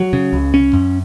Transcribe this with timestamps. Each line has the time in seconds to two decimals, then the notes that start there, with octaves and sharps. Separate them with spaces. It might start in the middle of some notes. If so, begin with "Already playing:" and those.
Already playing: F#3
0.13 C#3
0.33 C#2
0.54 C#4
0.73 F#2